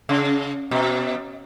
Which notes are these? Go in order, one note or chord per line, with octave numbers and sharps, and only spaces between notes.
C#3
B2